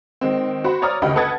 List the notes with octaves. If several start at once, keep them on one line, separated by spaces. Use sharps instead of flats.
D#3 G#3 C4
F#4 C5 B5
C#5 D5 A#5 D#6 F6
F#1 D2 D#3 G4 D#5 B5
A4 B4 F#5 D#6 G#6 A6